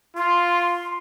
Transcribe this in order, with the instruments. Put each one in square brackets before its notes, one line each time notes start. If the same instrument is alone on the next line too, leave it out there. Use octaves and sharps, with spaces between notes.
[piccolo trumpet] F4 [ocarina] C6